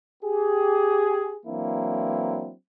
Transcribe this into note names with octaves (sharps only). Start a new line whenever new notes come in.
G4 G#4
E3 F#3 A#3 C4 D4 E4